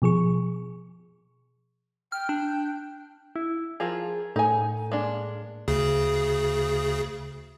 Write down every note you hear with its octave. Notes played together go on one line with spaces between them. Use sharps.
B2 F3 G#4 C#6
G5 F6
D4
E4
F3 F4 G#4 A#4
A2 D#4 G#5
G#3 A#3 D4
D2 C#3 G#4